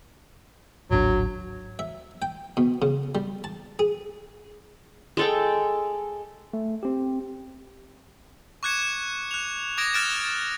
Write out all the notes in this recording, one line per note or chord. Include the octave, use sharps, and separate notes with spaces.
D1 G#1 F#3 D4
E5
G5
B2
C#3
G3
A5
G#4
G#3 A4 G5
A3
C4 G4
C#6 D6 F#6 G#6 C#7 E7
F#6 F7
D6 D#6 G#6 A#6 D7
F6 F#6 A6 D7 E7